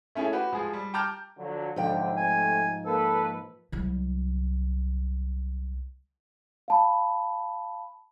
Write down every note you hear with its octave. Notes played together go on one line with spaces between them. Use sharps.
A3 C#4 E4 G#4 A4
F#4 G4 B4
F3 G#3 G#4
G3
G5 A5 A#5 D6 F6 G6
D3 F3 F#3
B1 G#2 D3 F3 G5
C3 A3 G#5
A#3 A4 B4
C2 F#3
F5 A5 B5